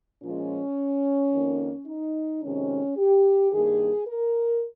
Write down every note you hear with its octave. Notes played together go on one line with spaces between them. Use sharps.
A#2 F3 G#3 C#4
F2 D#3 A#3
D#4
F2 C3 D#3 G#3 C#4
G4
G2 D#3 A#3 G#4
A#4